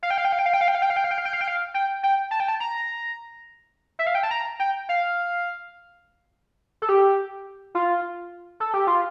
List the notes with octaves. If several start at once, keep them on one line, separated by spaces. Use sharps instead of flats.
F5
G5
F5
G5
F5
G5
F5
G5
F5
G5
F5
G5
F5
G5
F5
G5
F5
G5
F5
G5
F5
G5
G5
A5
G5
A5
A#5
E5
F5
G5
A5
A#5
G5
F5
A4
G4
F4
A4
G4
F4